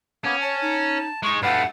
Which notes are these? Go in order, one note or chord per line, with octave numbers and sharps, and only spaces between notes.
A#3 B3 C#4 G#5
C#5 A5
D#4
G#3 D#4 C#6
G2 A3 B4 F5 F#5